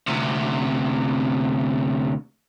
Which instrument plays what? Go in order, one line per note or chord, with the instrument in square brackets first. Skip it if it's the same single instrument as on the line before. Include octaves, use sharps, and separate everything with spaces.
[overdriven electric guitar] D2 C3